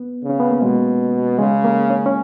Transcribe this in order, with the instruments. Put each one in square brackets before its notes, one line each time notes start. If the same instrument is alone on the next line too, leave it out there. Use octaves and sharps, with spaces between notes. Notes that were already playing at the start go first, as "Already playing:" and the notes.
Already playing: [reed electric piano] B3
[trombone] C#3
[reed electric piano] C#4
B3
A#3
[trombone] B2 [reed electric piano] G#3
[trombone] C#3 [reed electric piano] G#3
[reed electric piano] A#3
C#4
C#4